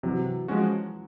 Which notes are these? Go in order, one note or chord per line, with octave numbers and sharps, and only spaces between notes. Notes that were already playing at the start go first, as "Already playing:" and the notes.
C3 E3 F#3
F3 G#3 C#4 F#4